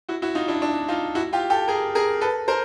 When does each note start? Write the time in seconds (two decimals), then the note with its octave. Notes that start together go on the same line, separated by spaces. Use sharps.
0.09 E4 F#4
0.22 E4 F#4
0.35 D#4 F4
0.48 D4 E4
0.62 D4 E4
0.88 D#4 F4
1.15 E4 F#4
1.33 F4 G4
1.50 G4 A4
1.68 G#4 A#4
1.95 G#4 A#4
2.21 A4 B4
2.48 A#4 C5